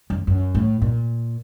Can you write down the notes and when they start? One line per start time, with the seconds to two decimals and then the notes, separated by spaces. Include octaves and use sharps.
0.10 F#2
0.27 F#2
0.55 A2
0.82 A#2